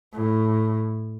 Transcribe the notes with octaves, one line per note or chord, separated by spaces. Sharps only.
A2